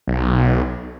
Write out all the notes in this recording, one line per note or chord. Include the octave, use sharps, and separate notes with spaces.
B1